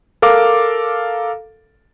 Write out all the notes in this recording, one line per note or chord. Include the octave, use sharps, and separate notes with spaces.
A4 A#4 F5 D6